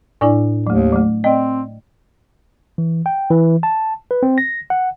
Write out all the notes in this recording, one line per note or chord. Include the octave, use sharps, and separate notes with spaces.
A2 D4 E4 D5 G#5
D#2 F#3 A3
F#3 A3
C4 D5 D#5 G5
E3
G5
E3
A5
B4
C4
A#6
F#5